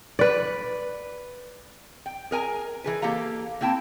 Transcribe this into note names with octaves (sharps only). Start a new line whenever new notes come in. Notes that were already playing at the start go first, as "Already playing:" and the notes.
B4 D5
G5
G#4 A#4 G#5 A#5
E3 G#4 B4
A#3 G4 A4 F5 A#5
A#3 C4 E4 G5 A5